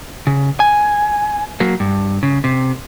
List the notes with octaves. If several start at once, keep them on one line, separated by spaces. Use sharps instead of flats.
C#3
G#5
F#3 A#3
G2
C#3
C3